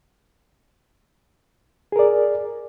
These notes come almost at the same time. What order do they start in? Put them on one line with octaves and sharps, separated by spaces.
G#4 A#4 D5